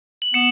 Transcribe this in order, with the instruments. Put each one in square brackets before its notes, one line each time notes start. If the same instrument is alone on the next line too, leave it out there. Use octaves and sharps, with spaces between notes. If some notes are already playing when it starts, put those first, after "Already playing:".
[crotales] F#7
[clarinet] B3 [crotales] C#7 E7